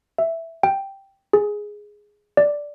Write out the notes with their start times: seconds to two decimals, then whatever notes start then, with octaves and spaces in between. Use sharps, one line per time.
0.18 E5
0.63 G5
1.33 G#4
2.37 D5